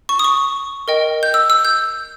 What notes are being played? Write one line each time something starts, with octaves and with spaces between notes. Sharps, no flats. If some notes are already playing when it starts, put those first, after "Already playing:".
C#6
D#6
C#6
A#4 D#5 G5
G6
E6
E6
G6